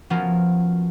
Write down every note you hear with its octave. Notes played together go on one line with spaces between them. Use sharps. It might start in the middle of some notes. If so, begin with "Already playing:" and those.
F3 B3 C#4 F4 F#4 A#4